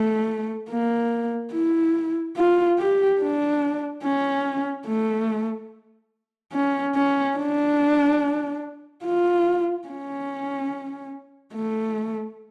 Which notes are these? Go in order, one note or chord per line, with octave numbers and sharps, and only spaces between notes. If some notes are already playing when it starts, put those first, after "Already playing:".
Already playing: A3
A#3
E4
F4
G4
D4
C#4
A3
C#4
C#4
D4
F4
C#4
A3